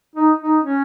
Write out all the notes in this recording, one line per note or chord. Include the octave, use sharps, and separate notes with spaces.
D#4
D#4
C#4